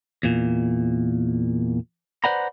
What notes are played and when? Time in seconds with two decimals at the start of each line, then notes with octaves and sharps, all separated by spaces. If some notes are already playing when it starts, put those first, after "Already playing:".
0.23 E2 A#2
2.24 B4 C5 D5 F#5 A#5 B5